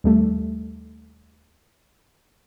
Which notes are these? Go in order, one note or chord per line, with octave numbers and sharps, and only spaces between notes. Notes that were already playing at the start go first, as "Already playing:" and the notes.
D#2 G3 A3